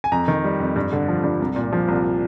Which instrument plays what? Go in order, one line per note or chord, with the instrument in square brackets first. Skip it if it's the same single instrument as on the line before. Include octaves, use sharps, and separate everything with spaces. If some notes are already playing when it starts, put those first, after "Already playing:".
[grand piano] G#5
F2 A#5
D#3
G3
F2
G2
D3
F3
G2
C2
A#2
F3
C2